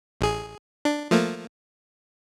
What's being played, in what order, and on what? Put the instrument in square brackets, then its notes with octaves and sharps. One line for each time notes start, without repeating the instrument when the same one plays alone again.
[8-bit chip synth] A1 G#4
D4
F3 A3 A#3